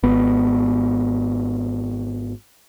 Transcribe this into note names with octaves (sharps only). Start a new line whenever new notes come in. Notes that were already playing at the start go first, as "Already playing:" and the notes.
G#1 B3